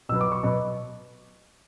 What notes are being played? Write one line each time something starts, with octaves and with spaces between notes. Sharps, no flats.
B2 F#3 B3 E6
D6
C#6
B2 F#3 B3